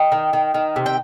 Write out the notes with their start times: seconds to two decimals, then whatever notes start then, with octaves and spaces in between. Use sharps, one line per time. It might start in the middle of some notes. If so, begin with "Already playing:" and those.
Already playing: D#5 G5
0.12 D#3
0.33 D#3
0.54 D#3
0.76 C3
0.86 G5